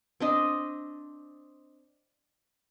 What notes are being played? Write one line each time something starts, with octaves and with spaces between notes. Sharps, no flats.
C4 D4 D#5